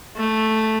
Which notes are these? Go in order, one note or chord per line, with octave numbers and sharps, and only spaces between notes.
A3